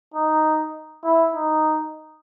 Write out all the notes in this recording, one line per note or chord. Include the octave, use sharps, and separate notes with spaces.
D#4
E4
D#4